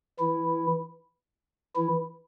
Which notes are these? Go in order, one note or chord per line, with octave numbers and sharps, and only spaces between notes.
E3 E4
E3 E4